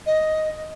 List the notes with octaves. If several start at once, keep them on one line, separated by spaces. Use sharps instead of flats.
D#5